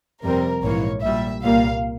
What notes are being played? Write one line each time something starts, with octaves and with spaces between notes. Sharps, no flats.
F2 C3 G3 C4 A#4
A#1 G#2 E3 A#3 C#5
A#1 A#2 G3 E5
C2 A#2 G3 A#3 F5